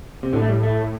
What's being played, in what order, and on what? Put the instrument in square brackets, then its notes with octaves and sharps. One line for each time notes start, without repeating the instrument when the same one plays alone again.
[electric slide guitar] C3
[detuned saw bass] A2 [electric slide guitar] D3
[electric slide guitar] A3
G3
A3